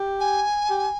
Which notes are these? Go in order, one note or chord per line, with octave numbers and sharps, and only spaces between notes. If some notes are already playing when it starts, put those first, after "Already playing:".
Already playing: G4
G#5
G4